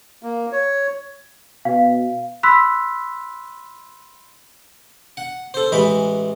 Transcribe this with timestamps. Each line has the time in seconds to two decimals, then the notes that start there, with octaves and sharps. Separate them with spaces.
0.23 A#3
0.52 C#5
1.65 B2 F5
2.43 B5 C6 E6 F#6 B6
5.17 F#5
5.54 A4 C5
5.72 A1 E3 G#3 B4 B5